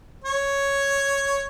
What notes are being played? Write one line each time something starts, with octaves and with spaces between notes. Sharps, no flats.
C#5